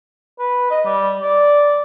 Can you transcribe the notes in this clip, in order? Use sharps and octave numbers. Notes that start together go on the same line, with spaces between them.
B4
D#5
G3
D5